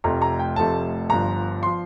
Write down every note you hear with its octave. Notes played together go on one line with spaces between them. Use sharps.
F1 F2 C3 F3 A3 A#5
A#5
G5
F1 F2 C3 F3 A3 A5
G1 G2 F3 A#5
F3 C6